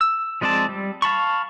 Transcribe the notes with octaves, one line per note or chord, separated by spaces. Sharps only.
E6
F3 G#3 C4 D5 A5
G3
F5 A5 B5 C#6